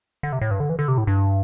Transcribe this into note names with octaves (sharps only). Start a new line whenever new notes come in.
D3
C3
A2
G2
D3
E3
D3
C3
A2
G2